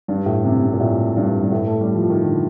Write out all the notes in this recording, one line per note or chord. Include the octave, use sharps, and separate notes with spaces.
G2
A2
C3
C3
A#2
A2
G2
G2
A2
A3
G3
F3
D#3
D3